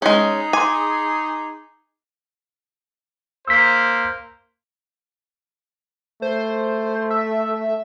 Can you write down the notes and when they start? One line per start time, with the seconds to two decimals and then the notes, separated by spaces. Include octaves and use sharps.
0.02 G#3 C#4 D#4 G#4
0.53 G#5 C6 D6
3.48 A#3 C5 E6 B6
6.22 A3 C5
7.10 E5